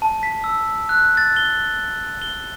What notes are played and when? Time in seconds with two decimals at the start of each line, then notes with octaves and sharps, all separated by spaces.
0.02 A5
0.23 B6
0.44 E6
0.89 F#6
1.17 A6
1.36 G7
2.22 G7